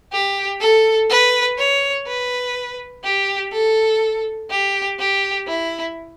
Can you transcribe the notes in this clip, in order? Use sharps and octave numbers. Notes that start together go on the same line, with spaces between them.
G4
A4
B4
C#5
B4
G4
A4
G4
G4
E4